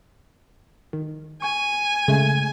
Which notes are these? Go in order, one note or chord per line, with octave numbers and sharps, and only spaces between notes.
D#3
G#5 C#6
C#3 G#3 A3